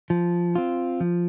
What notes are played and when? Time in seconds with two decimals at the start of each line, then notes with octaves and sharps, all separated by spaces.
0.10 F3
0.55 C4 F4
1.00 F3